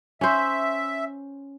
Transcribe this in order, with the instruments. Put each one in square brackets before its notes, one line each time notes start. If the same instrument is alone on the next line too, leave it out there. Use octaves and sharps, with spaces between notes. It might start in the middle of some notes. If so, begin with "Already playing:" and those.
[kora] C#4 C5 [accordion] E5